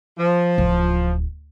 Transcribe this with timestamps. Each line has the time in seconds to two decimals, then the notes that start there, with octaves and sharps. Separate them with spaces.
0.19 F3
0.58 D1